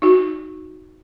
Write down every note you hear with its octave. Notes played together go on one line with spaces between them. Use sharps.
D#4 F#4